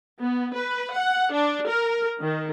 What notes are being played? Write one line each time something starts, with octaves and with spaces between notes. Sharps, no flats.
B3
B4
F#5
D4
A#4
D#3